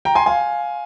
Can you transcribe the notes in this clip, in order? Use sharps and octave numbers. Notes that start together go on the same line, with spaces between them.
G5 A#5
G#5 C6
F5 G#5